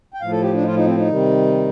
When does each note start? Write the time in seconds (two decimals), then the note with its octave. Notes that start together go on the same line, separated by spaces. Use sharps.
0.14 G5
0.21 A2 F3 F5
0.31 A4
0.42 G4
0.54 D4
0.61 D#4
0.65 F4
0.76 D#4
0.86 C4
0.97 D#4
1.08 C3 D#3 G3